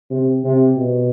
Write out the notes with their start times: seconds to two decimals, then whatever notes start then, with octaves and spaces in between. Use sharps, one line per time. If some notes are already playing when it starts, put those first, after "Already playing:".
0.11 C3
0.44 C3
0.77 B2